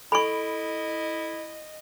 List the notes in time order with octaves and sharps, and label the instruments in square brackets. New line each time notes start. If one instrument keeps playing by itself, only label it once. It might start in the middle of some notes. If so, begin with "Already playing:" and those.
[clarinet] E4 [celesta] A4 D7 [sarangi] D#5 [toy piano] B5 C#6